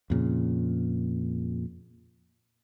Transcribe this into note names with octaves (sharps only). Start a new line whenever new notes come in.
F2 A#2 C#3